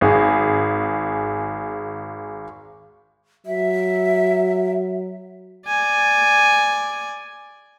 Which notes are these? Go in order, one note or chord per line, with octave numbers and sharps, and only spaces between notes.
G#1 G#4
F#3 E5
D5 G#5